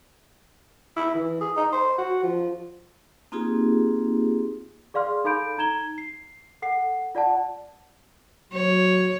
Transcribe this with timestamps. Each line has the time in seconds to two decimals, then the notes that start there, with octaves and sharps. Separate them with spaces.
0.97 E4
1.15 E3
1.41 G#4
1.57 D#4
1.72 C5
1.98 F#4
2.23 F3
3.32 A#3 C4 D#4 F4 G4 G#4
4.94 G#4 D5 F5 C6 F6
5.24 D#4 A4 F5 B5 G6 D7
5.58 D#4 A#5 G#6 E7 G7
5.98 C7
6.62 A4 F#5 C7
7.15 F4 D5 F#5 A5
8.53 F#3 C#5